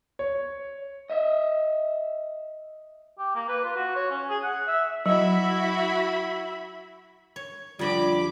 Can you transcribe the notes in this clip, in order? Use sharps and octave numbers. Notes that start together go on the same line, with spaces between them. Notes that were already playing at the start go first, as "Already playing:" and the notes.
C#5
D#5 E5
G4
A#3
B4
F4
F#4
C#5
C#4
G#4
F#5
E5
F#3 E4 F#4 E5 B5
C#5
F2 D3 G3 F4 B5 D6